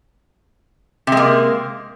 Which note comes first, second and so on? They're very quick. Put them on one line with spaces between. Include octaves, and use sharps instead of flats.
C3 G#3 A#3